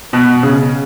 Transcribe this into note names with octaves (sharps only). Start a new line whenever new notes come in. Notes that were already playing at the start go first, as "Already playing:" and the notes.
B2
C#3